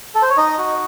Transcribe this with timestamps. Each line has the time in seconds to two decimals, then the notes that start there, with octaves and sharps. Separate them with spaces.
0.15 A4
0.22 C5
0.30 C#5
0.37 D#4 D#5
0.58 F#4